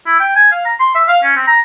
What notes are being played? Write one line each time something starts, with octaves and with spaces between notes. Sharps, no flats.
E4
G5
G#5
F5
A#5
C6
E5
F5
C#4
C4
A#5